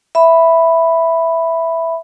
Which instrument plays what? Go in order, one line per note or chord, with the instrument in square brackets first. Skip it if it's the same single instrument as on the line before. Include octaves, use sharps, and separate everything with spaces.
[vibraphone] E5 B5